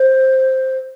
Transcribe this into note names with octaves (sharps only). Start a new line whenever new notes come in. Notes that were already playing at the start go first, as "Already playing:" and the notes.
Already playing: C5